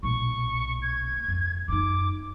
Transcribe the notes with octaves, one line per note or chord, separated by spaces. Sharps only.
B1 A#2 C#6
G#6
F2
F#2 D#4 D6